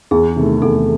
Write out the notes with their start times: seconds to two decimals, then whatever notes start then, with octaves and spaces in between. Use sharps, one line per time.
0.11 E2 G#4
0.36 C3 D#3 A3
0.62 E2 A4